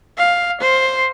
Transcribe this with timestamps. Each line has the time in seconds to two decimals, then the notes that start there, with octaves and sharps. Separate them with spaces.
0.18 F5
0.61 C5